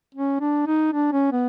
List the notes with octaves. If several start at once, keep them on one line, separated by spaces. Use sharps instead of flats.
C#4
D4
D#4
D4
C#4
B3